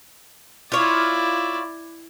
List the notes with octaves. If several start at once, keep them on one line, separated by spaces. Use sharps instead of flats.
E4 F4 C#5 D5